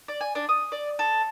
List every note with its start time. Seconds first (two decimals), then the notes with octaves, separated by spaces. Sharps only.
0.08 D5
0.21 G#5
0.35 D4
0.49 D#6
0.72 D5
0.99 A4